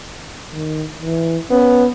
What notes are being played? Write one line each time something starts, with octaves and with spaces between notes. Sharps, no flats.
D#3
E3
B3 C#4